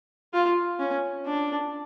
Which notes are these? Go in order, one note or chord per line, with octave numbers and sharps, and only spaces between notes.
F4
C#4
D4